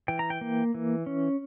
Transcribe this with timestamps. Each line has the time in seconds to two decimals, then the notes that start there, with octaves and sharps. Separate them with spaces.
0.08 E3 G5
0.19 A#5
0.30 G5
0.41 A#3
0.74 E3
1.06 C#4